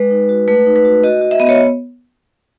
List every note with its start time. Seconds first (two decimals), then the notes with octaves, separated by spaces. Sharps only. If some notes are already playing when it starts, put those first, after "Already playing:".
Already playing: G#3 B4
0.11 D#4
0.29 F#4
0.48 A3 B4
0.66 D#4
0.76 B4
0.85 F#4
1.03 F#4 D#5
1.21 F#4
1.31 E5
1.40 B3 D#5
1.49 C#5